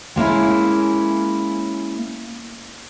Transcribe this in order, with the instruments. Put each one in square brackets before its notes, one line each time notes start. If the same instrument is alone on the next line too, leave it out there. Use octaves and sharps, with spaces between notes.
[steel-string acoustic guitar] G#3 A#3 C#4 E4